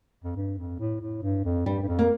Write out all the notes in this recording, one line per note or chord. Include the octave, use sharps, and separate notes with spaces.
F2
G2
F2
A2
A2
G2
F2
G2 G3
G2
F2
A#3